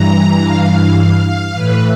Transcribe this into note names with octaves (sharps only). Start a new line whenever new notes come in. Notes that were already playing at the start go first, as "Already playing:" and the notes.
Already playing: G2 E3 A#5
F5
F5
F5
A2 E3 B4